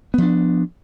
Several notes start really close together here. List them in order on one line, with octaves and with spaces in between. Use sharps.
B3 F3 D4